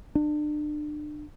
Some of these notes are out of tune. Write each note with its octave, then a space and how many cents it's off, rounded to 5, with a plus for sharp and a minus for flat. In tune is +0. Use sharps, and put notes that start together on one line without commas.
D4 +30